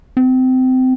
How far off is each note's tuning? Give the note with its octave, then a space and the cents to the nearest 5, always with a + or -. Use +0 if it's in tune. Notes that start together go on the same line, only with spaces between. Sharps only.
C4 -25